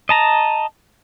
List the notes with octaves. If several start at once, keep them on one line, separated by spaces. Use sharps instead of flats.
D#5 A5 A#5